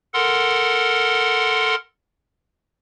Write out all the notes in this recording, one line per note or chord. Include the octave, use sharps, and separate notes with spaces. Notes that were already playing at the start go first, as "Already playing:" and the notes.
A4 A#4 F#5 C6